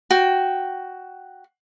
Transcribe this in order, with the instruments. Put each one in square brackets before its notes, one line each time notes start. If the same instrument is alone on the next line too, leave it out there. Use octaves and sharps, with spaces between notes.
[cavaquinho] F#4 G5